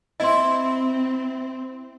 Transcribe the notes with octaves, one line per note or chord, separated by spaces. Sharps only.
C4 E4 D#5 C6